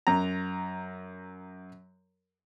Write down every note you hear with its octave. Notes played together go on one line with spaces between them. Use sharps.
F#2 A#5